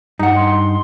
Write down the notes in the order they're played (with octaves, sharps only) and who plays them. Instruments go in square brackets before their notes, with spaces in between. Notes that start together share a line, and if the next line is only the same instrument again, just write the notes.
[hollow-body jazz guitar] G2 F#5 [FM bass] D#4
[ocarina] C6